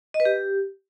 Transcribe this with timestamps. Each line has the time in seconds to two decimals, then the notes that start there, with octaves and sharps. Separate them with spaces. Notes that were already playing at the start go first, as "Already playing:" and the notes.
0.14 D#5
0.20 B4
0.25 G4